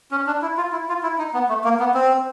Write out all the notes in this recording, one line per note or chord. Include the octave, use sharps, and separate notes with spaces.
C#4
D4
E4
F4
E4
F4
E4
D#4
B3
A3
A#3
B3
C4